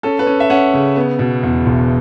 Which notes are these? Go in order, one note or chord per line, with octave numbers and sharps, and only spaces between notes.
C#4 A4
B4
C#4
E5
C#4 F#5
C#3
B3
B2
E2
E1